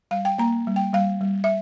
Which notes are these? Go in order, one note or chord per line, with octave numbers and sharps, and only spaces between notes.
G3 F5
G5
A#3 A#5
G3
G5
G3 F5
G3
E5